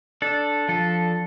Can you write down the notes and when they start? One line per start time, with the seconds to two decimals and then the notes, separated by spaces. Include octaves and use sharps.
0.22 D4 A4
0.68 F3 A4